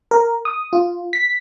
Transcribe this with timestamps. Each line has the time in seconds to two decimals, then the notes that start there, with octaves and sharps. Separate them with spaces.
0.11 A#4
0.45 D#6
0.73 F4
1.13 B6